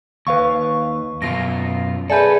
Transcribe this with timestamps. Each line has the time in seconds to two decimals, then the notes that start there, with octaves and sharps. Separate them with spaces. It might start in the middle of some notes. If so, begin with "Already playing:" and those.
0.27 D#2 B4 F5 C#6
1.22 F#2 B2 F4 A#6
2.10 G#4 A4 B4 D5 E5 G#5 G6